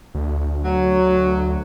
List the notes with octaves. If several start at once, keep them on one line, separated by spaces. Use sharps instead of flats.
D2
F#3